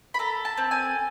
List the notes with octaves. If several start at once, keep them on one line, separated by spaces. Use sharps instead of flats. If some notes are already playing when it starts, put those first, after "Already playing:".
B5
A4 A#5
A5
C4
G#5